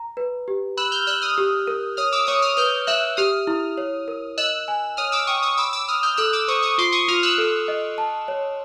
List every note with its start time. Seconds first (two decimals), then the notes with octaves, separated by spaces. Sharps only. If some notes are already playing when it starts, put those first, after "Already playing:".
Already playing: A#5
0.17 B4
0.48 G4
0.77 B5 E6 F#6
0.92 F6 G6
1.07 D5 E6 F#6
1.22 D#6 F6
1.38 G4
1.67 A#4
1.97 C#5 D#6 F6
2.12 D6 E6
2.27 C#5 C#6 D#6
2.42 D#6 F6
2.57 B4 F6 G6
2.87 E5 E6 F#6
3.17 G4 D#6 F6
3.47 E4
3.78 C#5
4.08 A#4
4.38 D#5 E6 F#6
4.68 G#5
4.97 C#5 D#6 F6
5.12 D6 E6
5.27 G5 C#6 D#6
5.43 C#6 D#6
5.58 B5 D6 E6
5.73 D6 E6
5.88 B5 D#6 F6
6.03 F6 G6
6.17 A4 E6 F#6
6.33 D6 E6
6.48 C5 C#6 D#6
6.62 C#6 D#6
6.78 F4 C6 D6
6.92 C#6 D#6
7.08 F4 D#6 F6
7.23 E6 F#6
7.38 A4
7.68 D#5
7.98 A5
8.28 C#5